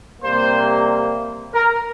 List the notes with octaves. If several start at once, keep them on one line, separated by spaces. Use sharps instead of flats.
C3 G3 A#3 C5
A#4